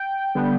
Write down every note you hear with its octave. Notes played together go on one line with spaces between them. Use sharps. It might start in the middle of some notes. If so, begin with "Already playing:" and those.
Already playing: G5
D3 G3 B3